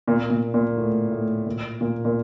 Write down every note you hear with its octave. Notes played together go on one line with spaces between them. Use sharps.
A#2
A#2
A#2
A2
A2
A#2
A#2
A#2